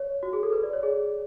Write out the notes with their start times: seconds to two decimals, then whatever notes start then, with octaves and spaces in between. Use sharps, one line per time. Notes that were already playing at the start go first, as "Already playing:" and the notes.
Already playing: C#5
0.23 F#4
0.33 G#4
0.43 A4
0.53 B4
0.63 D5
0.73 C#5
0.83 G#4